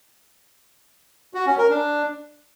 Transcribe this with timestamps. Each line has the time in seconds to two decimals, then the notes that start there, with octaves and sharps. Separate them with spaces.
1.34 F#4
1.46 C#4
1.58 A#4
1.70 D4